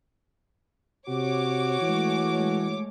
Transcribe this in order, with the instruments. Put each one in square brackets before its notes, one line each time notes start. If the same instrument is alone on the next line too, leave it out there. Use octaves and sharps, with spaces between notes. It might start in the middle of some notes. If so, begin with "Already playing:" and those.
[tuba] C3 [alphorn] F#4 [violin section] C#5 D6
[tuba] E3 [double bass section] G#3 A3